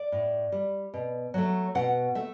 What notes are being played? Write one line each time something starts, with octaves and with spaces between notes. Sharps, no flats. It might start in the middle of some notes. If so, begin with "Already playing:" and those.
Already playing: D5
A2
G3
B2
F#3 A3
B2 F#5
A3 E5